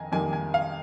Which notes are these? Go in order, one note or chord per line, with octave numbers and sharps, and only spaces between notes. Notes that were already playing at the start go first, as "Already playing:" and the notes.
Already playing: F2 D#3 G#5 A#5
F2 D#3 G3 A#3 G#5
G#5
F5